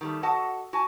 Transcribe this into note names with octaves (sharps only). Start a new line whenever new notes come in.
D#3 G3 A3
F#4 A4 D#5 F#5 A5
F#4 G#5 A5